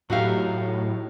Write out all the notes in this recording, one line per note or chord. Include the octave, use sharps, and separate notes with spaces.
A2 F#3 D#4 F#4 G4 E5 F5